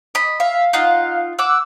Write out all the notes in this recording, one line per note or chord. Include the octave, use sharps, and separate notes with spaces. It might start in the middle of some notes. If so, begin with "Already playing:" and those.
D#5 B5
E5 F5
D#4 F4 F#5
F#5 D6 E6